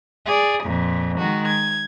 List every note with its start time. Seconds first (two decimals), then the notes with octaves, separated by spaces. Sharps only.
0.25 G#4 D5
0.64 F2 A#2
1.18 D#3 G#3 F#4
1.47 G#6